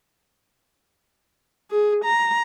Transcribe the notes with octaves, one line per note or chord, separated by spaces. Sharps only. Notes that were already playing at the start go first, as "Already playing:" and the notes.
G#4
A#5